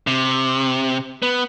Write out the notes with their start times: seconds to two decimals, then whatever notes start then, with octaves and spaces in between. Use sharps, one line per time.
0.07 C3
1.22 B3